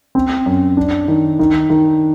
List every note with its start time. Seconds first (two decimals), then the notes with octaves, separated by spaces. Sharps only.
0.15 C4
0.46 F#2
0.77 D4
1.08 D#3
1.39 D#3
1.70 D#3